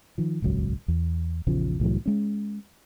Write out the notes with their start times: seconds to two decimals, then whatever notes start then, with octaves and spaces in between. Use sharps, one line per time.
0.18 D#3 F3
0.42 D#1 G#1 C#2 F#3
0.88 E2
1.47 A#1 E2 C#3 F3
1.80 C2 A2 E3 F#3
2.06 G#3 C#4